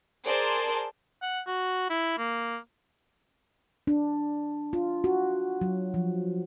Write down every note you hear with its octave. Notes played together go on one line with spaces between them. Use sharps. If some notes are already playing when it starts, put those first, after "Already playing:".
G#4 A#4 C5 D5 A5 C6
F#5
F#4
E4
A#3
D4
F4
F#4
F#3
F3